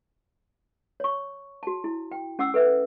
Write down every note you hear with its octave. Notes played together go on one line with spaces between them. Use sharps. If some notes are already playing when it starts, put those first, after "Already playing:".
C#5 C#6
F#4 A5
E4
G5
C#4 F#5 D6 E6
A4 B4 E5